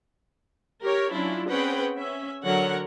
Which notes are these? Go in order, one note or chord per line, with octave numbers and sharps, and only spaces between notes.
G4 A#4 C#5
F#3 C#4 D4 E4 F4
C4 C#4 G#4 B4 F#5 G5
C#4 E5
D3 F#3 A#4 C#5 F#5